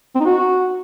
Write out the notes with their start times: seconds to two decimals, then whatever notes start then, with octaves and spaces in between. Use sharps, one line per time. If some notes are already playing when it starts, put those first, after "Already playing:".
0.15 C4
0.20 D#4
0.25 F#4